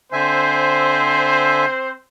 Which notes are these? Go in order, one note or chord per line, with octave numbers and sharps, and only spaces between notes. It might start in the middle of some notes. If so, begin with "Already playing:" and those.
D3 C4 C5 E5 G#5